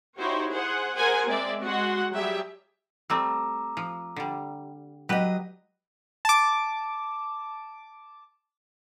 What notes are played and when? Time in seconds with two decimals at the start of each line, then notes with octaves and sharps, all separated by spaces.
0.18 D#4 E4 F#4 G4 C5 C#5
0.50 G#4 C5 F#5
0.96 G#4 A#4 C5 F#5 G#5
1.26 G#3 C4 D5 E5
1.62 G#3 F#4 F#5 C6
2.11 F#3 G3 G4 G#4 E5
3.10 G3 A3 C4 A#5 D6 E6
3.77 F3
4.16 D3 G3
5.09 F#3 G4 B4 D#5
6.25 A5 D6